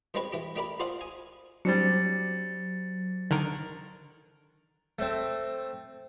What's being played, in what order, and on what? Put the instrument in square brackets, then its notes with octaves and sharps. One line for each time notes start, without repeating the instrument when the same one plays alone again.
[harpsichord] D#3 G3 G#3 C4 B4 C#5
E3 E4 G4
A3 D4 G4 A#4 D5 B5
F4 G#4 C5 D5 F5 F#5
G#5 D#6
[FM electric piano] F#3 [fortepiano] G3 C4 D4 [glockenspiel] A6 C#7
[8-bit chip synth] D3 D#3 A#4
[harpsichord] A3 C4